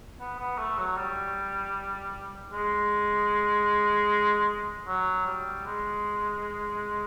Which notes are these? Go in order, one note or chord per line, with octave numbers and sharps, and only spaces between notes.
B3
B3
A3
F#3
G3
G#3
F#3
G3
G#3